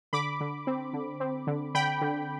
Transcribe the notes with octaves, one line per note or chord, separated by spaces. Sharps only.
D3 B5 D6
D3
C4
D3
C4
D3
D3 G5 B5
D3